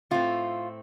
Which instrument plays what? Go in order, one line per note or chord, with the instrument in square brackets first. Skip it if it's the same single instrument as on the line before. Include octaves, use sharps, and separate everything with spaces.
[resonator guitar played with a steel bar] A2 A3 C4 F4